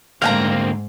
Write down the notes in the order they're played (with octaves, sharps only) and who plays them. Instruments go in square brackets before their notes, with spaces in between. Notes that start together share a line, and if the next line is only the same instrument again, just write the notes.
[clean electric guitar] D2 A#3 C4 [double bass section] G#2 [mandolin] F5 G5 A#5